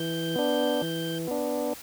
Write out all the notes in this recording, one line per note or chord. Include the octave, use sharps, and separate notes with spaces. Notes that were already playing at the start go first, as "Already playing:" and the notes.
Already playing: E3 G6
B3 D4
E3
B3 D4